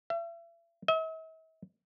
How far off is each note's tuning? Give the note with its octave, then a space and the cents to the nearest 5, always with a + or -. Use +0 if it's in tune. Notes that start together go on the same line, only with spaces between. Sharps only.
E5 +40
E5 -45